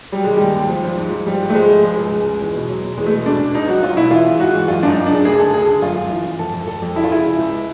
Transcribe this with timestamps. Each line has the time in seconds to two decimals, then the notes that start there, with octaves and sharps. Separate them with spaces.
0.12 F#3 G3
0.24 D#3 G#3
0.36 D#2 G3
0.56 D#2
0.69 F3
0.84 F3
0.98 G#2
1.12 F3
1.26 F3 G3
1.41 G#2
1.50 A3
1.55 F3 G#3
1.69 F3
1.83 C#2 G#3
1.98 C#2
2.12 C#2
2.26 C#2
2.41 E2
2.55 B2
2.69 F#3
2.83 B2
2.97 E2 G#3
3.06 A3
3.12 B2 G#3
3.26 B2 D4
3.40 B2
3.54 C#2 D#4
3.68 F#3 F#4
3.83 F#3 F4
3.97 B2 E4
4.11 E3 F4
4.26 G#2
4.40 G#2 F#4
4.54 E3
4.68 F#2 F4
4.83 F#2 D4
4.87 D#4
4.97 F#2
5.06 C#3 D4
5.25 D2 G#4
5.39 D2 A4
5.54 D2 G#4
5.67 D3
5.82 F#2 F4
5.96 F#2
6.11 E3
6.25 E3
6.39 F2 A4
6.53 F2
6.67 F2 A4
6.82 F2
6.96 C#3 E4
7.04 F4
7.10 C#3 E4
7.24 C#2
7.38 C#2